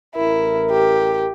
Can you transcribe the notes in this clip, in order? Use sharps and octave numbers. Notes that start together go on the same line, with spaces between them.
A1 E4 A#4
G4